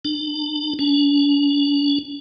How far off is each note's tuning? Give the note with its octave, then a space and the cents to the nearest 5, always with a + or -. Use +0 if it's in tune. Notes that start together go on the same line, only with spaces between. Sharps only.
D4 +35
D4 -45